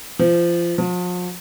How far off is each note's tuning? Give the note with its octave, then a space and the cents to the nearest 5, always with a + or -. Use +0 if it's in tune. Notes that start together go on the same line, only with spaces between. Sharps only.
F3 -25
F3 +40